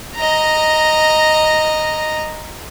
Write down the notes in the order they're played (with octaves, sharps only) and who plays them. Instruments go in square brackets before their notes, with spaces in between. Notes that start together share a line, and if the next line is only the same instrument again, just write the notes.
[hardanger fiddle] D#5 A#5